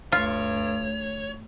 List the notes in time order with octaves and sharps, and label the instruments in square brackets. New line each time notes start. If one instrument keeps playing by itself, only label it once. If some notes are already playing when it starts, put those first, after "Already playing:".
[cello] D2 [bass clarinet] G2 [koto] F4 [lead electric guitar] C#5